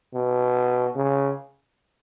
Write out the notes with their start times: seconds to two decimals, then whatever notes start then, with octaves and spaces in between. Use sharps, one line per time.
0.15 B2
0.96 C#3